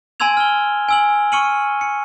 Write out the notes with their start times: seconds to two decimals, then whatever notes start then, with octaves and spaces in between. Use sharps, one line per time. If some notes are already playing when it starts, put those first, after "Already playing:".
0.20 G#5 A5 C6 E6 G#6 F7
0.37 F6 G7
0.89 G#5 E6 F#7
1.32 C#6 F6 C#7 D#7 F#7
1.81 C#7